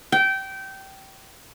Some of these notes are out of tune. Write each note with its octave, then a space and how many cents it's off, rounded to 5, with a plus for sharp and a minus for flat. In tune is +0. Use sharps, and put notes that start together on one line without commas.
G5 -20